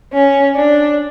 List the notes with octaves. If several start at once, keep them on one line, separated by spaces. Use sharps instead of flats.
C#4
D4